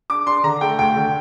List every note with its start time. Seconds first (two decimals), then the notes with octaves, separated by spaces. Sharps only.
0.10 D4 D6
0.26 D4 C6
0.44 D3 A#5
0.61 A3 G5
0.79 D2 G5
0.96 D3